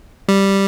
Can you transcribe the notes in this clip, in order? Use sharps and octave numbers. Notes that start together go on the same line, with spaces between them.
G3